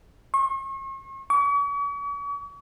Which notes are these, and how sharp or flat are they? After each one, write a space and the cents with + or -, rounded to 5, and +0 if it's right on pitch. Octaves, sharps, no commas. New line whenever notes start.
C#6 -45
C#6 +45